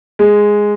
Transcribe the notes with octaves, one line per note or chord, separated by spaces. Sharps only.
G#3